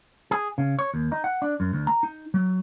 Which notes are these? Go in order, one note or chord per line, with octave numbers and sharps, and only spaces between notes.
G#4
C#3
C#5
D#2
D#4
F#5
D4
F#2
D2
A#5
D#4
F#3